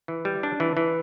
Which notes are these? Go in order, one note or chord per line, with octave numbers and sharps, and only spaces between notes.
E3
G3
D4
E3
E3